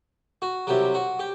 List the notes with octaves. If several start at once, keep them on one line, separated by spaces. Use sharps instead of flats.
F#4
C2 C3 F#3 G4
F#4
G4